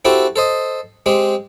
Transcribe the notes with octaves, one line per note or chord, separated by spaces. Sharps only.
C4 E4 F#4 G4 A4
A4 C5 D#5
G#3 C4 G4